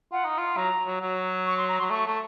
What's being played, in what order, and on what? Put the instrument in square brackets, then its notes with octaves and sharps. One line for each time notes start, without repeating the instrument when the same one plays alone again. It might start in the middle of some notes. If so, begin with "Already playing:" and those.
[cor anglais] F4 [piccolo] F#5
[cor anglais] D#4
F4
[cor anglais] F#3 [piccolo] A#5
[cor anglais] F#3
F#3
[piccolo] C#6
C6
A#5
[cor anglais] F#3 [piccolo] C6
[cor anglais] A3 [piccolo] C#6
[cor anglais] A3